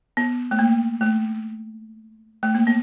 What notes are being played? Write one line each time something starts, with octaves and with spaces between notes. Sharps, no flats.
B3
A3
A#3
A3
A3
A#3
B3